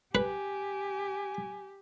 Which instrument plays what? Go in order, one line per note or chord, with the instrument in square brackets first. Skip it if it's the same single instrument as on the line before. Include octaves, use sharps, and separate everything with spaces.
[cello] G4 [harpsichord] B4 [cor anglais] G#5